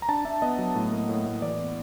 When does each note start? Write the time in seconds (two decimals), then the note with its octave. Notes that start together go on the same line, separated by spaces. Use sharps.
0.02 A#5
0.08 D4 A5
0.25 D4 E5
0.42 B3 D#5
0.58 F#3
0.75 A2
0.92 A#3
1.09 A2
1.25 A2
1.42 E3 D5
1.59 B3